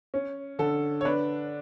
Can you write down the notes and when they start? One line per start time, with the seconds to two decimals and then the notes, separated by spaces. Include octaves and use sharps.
0.14 C#4
0.59 D3 A4
1.01 C#5
1.05 D4 B4